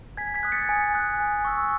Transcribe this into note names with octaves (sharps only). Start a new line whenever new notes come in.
G#5 G#6 B6
G#6 B6
D#6 F#6
A6 C#7
G#5
D#6 F#6
G#5
C#6 E6